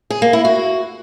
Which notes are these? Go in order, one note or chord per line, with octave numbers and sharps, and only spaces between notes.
G#4
A#3
E4
F#4